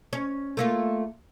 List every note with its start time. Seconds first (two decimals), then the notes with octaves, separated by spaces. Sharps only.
0.13 C#4
0.57 A3 A#3 F4